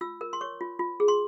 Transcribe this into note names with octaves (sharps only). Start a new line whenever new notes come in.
F4 E6
A#4
C6
C#5 C#6
F4
F4
G#4
C6